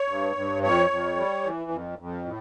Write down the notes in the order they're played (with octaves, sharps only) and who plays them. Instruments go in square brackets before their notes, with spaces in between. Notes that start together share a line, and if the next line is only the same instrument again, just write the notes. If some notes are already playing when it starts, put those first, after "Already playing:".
Already playing: [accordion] C#5
G2
G2
F2 C#5
F2
G3
E3
F2
F2
A2